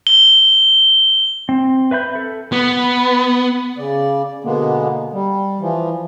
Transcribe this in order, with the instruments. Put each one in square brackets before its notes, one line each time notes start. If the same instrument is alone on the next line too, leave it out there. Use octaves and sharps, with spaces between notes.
[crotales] G7
[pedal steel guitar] C4
B4 E5 B5 G6
A4
[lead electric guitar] B3
[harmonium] C#3 D5
B2 D3 G#3 A#3 B3
G3
E3 F3